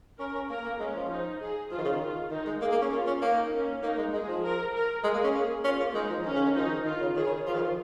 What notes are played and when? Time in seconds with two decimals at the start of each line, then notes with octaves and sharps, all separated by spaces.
0.19 C#4 A#4
0.35 C#4
0.49 A#3 A#4
0.65 A#3
0.80 G#3 C#4
0.95 F3
1.10 D#4
1.40 G#4
1.71 F3 F4
1.78 D#3
1.85 C#3
1.92 D#3
2.01 F4
2.31 D#3 D#4
2.46 G#3
2.61 A#3 G#4
2.72 A#3
2.82 C#4
2.92 A#3 F4
3.07 C#4
3.22 A#3 D#4
3.52 C#4
3.83 A#3 D#4
3.98 G#3
4.13 G#3 G#4
4.28 F3
4.43 A#4
4.74 A#4
5.04 G#3 G#4
5.14 A#3
5.24 C#4
5.34 A#3
5.65 C#4 F4
5.79 A#3
5.94 G#3 D#4
6.10 F3
6.25 D#3 C#4
6.35 C#3
6.45 D#3
6.56 F3 D#4
6.70 D#3
6.85 D#3 F4
7.01 C#3
7.16 D#3 G#4
7.26 C#3
7.46 F3 F4
7.54 D#3
7.62 F3